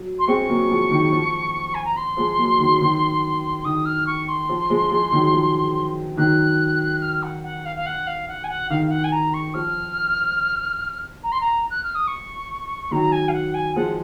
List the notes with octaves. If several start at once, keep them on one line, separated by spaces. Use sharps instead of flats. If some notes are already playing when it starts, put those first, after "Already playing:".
Already playing: F#3
C6
G#3 C4 C#6
F#3 A#3
F3 G#3
D#3 F#3
F3
G#5
A#5
C6
F3 G#3
F#3 A#3
D#3 F#3
D#3 F#3
D#3 D#6
F6
C#6
C6
F3
F3 G#3
F3 G#3
D#3 F#3
F3
D#3 F#3 F#6
F6
F#5
F#5
F5
F5
F#5
F5
F#5
G#5
F#5
D#3 F5
F5
F#5
G#5
A#5
C#6
F3 F6
A#5
C6
A#5
F#6
F6
D#6
C#6
D#3 F#3 A#5
G#5
F5
F#5
G#5
F3 G#3 F#5